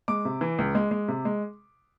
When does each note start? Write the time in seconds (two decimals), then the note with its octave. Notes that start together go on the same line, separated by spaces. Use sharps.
0.08 G#3 D6
0.25 C3
0.41 E3
0.58 C#2
0.75 G#3
0.91 G#3
1.08 C3
1.25 G#3